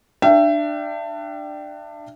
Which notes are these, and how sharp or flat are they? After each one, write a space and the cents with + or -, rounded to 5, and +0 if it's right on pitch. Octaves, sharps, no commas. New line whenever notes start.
D4 +20 E5 +35 G5 -15